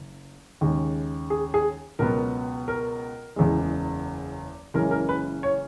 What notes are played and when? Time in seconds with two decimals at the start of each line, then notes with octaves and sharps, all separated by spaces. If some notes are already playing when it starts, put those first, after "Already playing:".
Already playing: F#1
0.61 D#2 C#3 G#3
1.30 G#4
1.54 G#4
1.99 C#2 B2 F#3 B3 A#4
2.68 A#4
3.36 F#1 E2 C#3 G#3
4.74 F#1 F#2 E3 G#3 C#4 A#4
4.91 A#4
5.09 B4
5.43 C#5